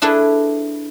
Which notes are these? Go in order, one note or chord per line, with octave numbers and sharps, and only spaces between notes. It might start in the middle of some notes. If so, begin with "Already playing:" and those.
D4 E4 G#4 A4 B4